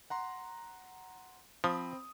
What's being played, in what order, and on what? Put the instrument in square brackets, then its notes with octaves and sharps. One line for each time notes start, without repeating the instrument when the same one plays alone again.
[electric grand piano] F#5 A#5 C6
[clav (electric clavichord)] F3 [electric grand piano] C4 B5 D#6